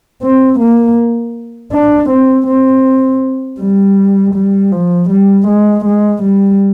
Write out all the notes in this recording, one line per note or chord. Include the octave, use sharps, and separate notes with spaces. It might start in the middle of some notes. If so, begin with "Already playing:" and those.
C4
A#3
D4
C4
C4
G3
G3
F3
G3
G#3
G#3
G3